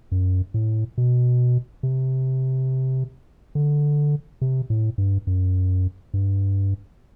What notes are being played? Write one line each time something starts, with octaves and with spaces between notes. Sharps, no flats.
F#2
A2
B2
C3
D3
C3
A2
G2
F#2
G2